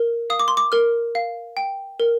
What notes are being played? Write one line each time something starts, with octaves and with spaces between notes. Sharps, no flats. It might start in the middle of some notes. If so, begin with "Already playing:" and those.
Already playing: A#4
F5 D#6
D6
C6
D6
A#4 F6
F5
G5
A#4